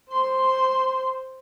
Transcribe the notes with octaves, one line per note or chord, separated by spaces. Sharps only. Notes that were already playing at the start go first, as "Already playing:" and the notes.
C5 C6